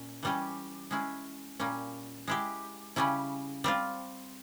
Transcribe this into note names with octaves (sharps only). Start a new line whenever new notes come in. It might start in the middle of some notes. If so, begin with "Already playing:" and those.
Already playing: A#2 C#4
E3 G3 C#4 G4
G#3 C#4 E4
A#2 G3 C#4
G#3 E4 G4
C#3 G3 C#4 E4
G3 C4 F4